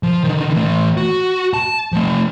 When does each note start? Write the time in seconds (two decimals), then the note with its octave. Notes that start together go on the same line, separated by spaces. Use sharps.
0.03 F3
0.24 D3 D#3
0.53 E3 A3
0.97 F#4
1.54 A5
1.93 F3 A3